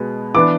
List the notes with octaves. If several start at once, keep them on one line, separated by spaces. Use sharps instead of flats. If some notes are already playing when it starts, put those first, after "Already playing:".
Already playing: B2 G#3 B3
E3 B3 D4 D6